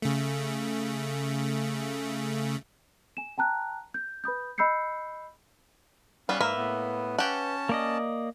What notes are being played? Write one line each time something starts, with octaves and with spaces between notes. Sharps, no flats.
C#3 A3
G#5 E7
G5 A5 A#5 F#6
G6
B4 B5 D#6 G6
D#5 B5 E6 G6 C7 C#7
G3 B3 C#4 F5
G#2 A#3 B4 E5
A2 B3
C#4 G4 F#5 A5
A#3 D5 D#5